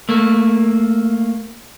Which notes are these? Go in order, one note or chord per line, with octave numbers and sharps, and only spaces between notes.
A3 A#3